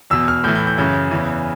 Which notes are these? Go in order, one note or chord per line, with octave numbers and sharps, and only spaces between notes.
E2 B2 E6
F6
A2 E3 G6
G6
G6
F#2 C#3 E3 G6
E2 C#3 E3